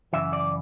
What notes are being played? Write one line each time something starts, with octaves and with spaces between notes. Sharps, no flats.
F#2 C#3 E3 E5
D5